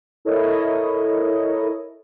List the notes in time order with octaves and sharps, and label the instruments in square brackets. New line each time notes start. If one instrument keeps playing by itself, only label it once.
[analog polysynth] E4 A4 A#4 C#5 D#5